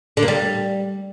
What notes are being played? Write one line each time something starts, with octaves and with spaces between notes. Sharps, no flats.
D3
A#3
G3